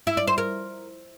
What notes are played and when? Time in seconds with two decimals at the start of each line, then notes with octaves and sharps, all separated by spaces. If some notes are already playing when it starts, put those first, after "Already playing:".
0.07 E4
0.17 D5
0.27 C5
0.38 A#4